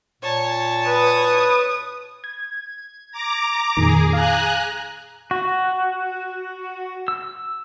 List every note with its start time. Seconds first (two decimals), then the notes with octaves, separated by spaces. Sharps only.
0.22 A#2 C#5 A5
0.87 B4 D#6
2.24 G#6
3.12 A#5 D6
3.77 F2 A#2 D#3 G#4
4.13 F5 G#5 A#5 F#6
5.31 F#4
7.08 E6